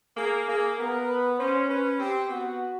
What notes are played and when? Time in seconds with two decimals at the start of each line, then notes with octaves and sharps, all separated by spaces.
0.17 A#3 G#4
0.48 A#3 G#4
0.78 B3 A#4
1.08 B4
1.39 C#4 C5
1.69 C#4 B4
1.99 C4 G4
2.30 B3 F#4